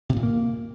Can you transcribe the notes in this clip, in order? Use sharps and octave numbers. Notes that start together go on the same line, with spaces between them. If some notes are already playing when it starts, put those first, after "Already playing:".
C3
A#2
A#3